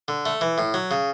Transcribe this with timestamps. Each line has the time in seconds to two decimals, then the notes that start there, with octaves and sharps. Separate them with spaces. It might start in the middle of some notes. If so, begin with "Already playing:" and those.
0.08 D3
0.26 A3
0.41 E3
0.58 A2
0.74 F#3
0.91 C#3